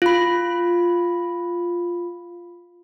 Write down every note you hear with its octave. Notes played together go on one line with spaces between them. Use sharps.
F4 B5